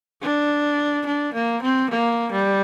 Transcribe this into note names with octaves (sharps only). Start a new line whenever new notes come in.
D4
D4
A#3
C4
A#3
G3